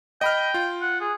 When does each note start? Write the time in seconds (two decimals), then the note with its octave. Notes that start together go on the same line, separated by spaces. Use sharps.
0.21 D#5 G5 B5 F6
0.54 F4
0.81 F#5
1.01 G#4